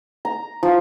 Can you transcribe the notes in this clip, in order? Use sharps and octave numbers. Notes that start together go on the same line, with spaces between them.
A#5
F3